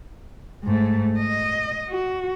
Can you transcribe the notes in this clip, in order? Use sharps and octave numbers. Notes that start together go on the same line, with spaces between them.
G#2 A3
D#5
F#4